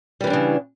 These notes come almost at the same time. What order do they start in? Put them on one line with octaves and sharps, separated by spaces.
G3 E3 C#4 D4 C#3